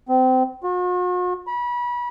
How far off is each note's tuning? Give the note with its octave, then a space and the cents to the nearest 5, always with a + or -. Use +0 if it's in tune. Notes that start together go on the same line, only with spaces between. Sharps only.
C4 -25
F#4 -45
B5 -30